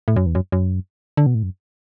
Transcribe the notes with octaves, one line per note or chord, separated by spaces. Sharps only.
A2
F#2
E2
F#2
F#2
D3
B2
A2
F#2